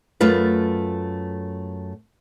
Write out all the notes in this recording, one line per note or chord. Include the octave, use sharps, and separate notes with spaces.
F#2 A3 F4 B4